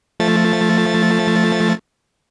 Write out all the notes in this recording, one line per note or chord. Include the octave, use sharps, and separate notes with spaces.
F3 A3 A6